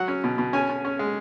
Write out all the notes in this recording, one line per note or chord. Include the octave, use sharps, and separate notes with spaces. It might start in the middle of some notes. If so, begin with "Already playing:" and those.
Already playing: F#3 F#5
C#4
B2
B2
C#4 G#5
C#4
C#4
G#3